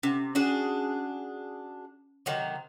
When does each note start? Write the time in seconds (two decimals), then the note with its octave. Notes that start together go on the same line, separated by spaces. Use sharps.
0.03 C3 C#4
0.35 C#4 D4 F#4 G#4
2.26 C3 D#3 F#3